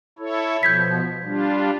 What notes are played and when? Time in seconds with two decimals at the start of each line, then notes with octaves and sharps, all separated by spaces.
0.19 E4 A4 C#5
0.63 B2 F3 G6 G#6 B6
1.24 G3 D4 F4